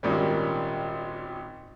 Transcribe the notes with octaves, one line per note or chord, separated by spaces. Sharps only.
G#1 A#2 G3 C#4